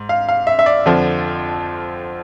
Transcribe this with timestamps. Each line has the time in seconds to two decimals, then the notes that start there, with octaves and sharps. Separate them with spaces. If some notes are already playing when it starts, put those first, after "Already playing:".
Already playing: G#2
0.09 F5
0.29 F5
0.47 E5
0.59 E5
0.66 D5
0.86 F2 D3 F3